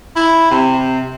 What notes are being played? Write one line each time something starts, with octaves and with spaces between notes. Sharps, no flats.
E4
C3